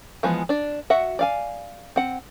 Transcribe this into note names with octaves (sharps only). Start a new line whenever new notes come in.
E3 F3 G#3 B3
D4 D5
F#4 E5 F#5
D5 F5 G#5
C4 F#5